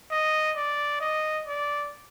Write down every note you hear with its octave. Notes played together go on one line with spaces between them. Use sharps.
D#5
D5
D#5
D5